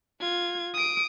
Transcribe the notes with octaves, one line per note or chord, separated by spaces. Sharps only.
F4 G#6
D#6 D7